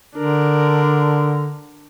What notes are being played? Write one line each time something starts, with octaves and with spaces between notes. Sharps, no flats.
D3 D4 A#4